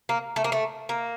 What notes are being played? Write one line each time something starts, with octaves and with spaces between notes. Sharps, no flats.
A#3
A3
A#3
A3
A#3